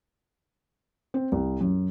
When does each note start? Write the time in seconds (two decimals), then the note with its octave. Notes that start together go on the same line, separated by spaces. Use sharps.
1.14 C4
1.32 C2
1.61 F#2